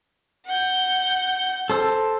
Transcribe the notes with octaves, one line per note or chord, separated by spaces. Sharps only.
F#5 G6
A4 C5 E6